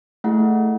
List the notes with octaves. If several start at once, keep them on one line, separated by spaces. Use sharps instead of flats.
A3 E4 G#4 F#5